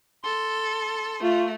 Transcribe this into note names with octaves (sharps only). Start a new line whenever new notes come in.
A4 C6
A3 F4